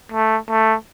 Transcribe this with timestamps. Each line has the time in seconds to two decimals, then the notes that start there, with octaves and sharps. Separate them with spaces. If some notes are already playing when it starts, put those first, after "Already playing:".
0.12 A3
0.49 A3